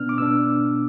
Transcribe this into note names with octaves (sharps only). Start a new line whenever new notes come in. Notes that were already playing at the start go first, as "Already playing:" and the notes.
Already playing: B2 B3 D4 F6
D6
B2 B3 D4 E6